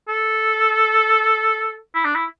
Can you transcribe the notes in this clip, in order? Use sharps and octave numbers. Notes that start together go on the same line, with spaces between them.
A4
E4
D4
E4